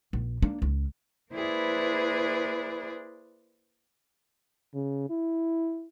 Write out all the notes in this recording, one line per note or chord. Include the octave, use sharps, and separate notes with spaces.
A#1
A#3 D4
C#2
A#3 E4 G#4 B4 C5 D5
C#3
E4